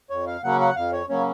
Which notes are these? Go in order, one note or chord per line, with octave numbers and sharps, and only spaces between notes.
F2 C#5
F5
C#3 F#3 A#3 C#4 F#5
F#5
F2 F5
C#5
C#3 F#3 A#3 C#4 C#5